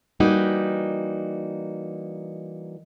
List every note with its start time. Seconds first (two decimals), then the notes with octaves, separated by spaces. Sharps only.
0.20 E3 G3 A#3 D#4 F#4